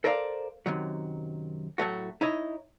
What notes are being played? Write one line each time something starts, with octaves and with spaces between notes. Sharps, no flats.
A4 A#4 C5 D5 D#5 F5
F#2 C3 D#3 F#3
A2 F#3 A3 F#4
D#4 E4 C#5 D#5